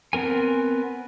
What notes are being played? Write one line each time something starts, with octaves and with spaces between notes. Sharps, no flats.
B3 C4 A#4 G#5